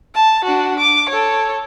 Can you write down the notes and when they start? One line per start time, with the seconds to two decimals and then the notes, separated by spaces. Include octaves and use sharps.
0.14 A5
0.44 D4 F#4
0.79 D6
1.09 A4 C#5